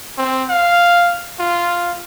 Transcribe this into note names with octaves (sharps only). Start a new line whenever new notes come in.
C4
F5
F4